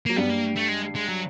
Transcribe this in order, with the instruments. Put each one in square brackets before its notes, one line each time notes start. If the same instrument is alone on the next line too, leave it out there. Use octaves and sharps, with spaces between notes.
[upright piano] F#3 [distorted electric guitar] A#3
[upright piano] G2 G3 [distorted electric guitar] B3
[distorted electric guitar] A#3
A3
G#3
G#3
F#3